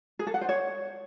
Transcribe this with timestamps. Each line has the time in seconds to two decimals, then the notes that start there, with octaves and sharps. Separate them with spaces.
0.19 G#4
0.27 A4
0.34 F#5
0.41 C5
0.49 C#5